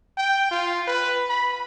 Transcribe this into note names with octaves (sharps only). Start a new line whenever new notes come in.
G5
F4
B4
B5